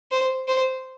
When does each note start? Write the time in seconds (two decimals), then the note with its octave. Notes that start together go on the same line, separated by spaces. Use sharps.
0.12 C5
0.48 C5